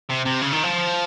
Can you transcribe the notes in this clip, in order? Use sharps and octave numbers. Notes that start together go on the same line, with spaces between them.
C3
C3
C#3
D#3
F3